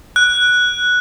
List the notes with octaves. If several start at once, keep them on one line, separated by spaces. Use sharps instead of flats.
F#6